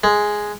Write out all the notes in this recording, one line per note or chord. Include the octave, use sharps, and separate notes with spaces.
G#3